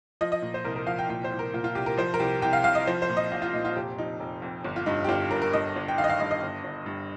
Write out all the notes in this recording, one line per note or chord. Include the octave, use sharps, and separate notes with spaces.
F3 D#5
D#5
A#2
C5
C2 A#4
A#4
F3 F5
G5
A#2 G5
C5
C2
A#4
A#2 F4
F4
C2 G4
A#4
F3 C5
A#4
C2 G4
C2 G5
F5
C2 F5
D#5
F3 C5
C5
A#2
D#5
A#1 F5
F4
A#2 D#4
F4
F1 G4
F3 D#4
F1
F2
G1
F4
G2 D#4
G4
G1 F4
G1 A#4
A#4
G2 D#5
G1
G5
D#3 F5
D#5
F5
G2 D#5
D#5
G1
G1
G2